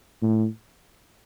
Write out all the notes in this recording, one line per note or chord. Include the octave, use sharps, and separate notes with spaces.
A2